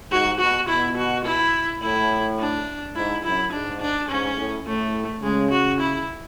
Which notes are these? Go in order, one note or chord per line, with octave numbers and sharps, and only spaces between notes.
G#2 F#4
B2 F#4
B2 E4
F#4
E4
A2 E4
D4
G#2 E4
F#2 E4
G#2 D4
D4
G#2 C#4
A2
A2 A3
C#3 G#3
F#4
E4